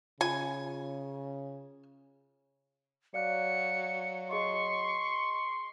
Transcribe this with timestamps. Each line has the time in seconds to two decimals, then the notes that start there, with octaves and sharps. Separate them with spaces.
0.21 C#3 F4 G#5
3.14 F#3 D5 F5 F#6 C#7
4.31 G#4 D#5 C6 C#6